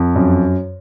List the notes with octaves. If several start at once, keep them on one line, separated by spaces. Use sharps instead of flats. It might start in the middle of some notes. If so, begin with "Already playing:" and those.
Already playing: F2
F#2